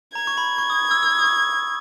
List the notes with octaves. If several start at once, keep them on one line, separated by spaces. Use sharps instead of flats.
A#5 G#6
C#6
B5
C#6
D#6
E6
E6
D#6
C#6